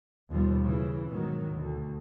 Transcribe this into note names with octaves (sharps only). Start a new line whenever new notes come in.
D#2 B2 F3 G3
C#3 E3
G#2 B2 D#3 F#3
D2